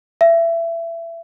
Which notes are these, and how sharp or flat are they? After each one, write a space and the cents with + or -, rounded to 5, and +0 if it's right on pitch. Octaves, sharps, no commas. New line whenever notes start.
E5 +25